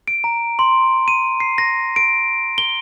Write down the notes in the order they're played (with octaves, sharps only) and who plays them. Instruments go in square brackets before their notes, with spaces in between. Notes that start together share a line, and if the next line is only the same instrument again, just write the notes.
[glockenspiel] D7
A#5
C6
D#7
C7
A#6
D7
G7